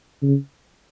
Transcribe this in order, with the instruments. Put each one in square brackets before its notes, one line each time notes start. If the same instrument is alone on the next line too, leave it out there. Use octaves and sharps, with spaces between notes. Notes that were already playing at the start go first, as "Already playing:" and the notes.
[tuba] C#3